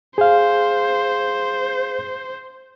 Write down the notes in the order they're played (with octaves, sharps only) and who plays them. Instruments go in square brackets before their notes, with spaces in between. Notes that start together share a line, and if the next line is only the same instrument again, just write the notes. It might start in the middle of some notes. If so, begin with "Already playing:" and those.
[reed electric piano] G#4 F5 [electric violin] C5